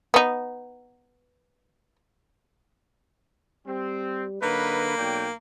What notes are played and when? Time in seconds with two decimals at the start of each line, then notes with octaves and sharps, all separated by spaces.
0.14 B3 D#4
3.67 G3 C4
4.42 D3 F#3 A#3 D#4 B4
4.98 B1 C#5 D5 G5